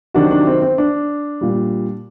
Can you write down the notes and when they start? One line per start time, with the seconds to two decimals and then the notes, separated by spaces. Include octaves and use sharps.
0.14 C3 D#3 F#3 D4 F#4
0.31 D4
0.47 C4
0.62 C4
0.78 D4
1.41 A#2 G3